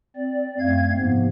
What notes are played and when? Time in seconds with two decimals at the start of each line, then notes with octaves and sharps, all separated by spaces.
0.16 C4 D5
0.59 F#2 A3 C4 F5 G#6
0.97 G#2 C3 F3 A#3 B3